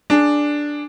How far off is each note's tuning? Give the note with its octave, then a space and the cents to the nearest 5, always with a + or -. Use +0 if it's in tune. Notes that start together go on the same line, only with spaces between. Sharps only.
D4 +0 G#4 +0